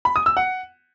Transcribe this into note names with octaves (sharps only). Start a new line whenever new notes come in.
B5
D#6
E6
F#5